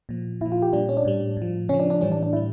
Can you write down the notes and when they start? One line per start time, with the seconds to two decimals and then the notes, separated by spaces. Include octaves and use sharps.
0.09 A#2 F3
0.41 A#2 E4
0.46 F3
0.52 F4
0.62 G4
0.73 A#2 G3 D4
0.89 C#4
0.97 D4
1.05 A2 G3
1.37 A2 F3
1.69 C#3 F3 C#4
1.80 D4
1.90 D4
2.01 A2 E3 G3 C#4
2.12 D4
2.23 D4
2.33 A2 G3 E4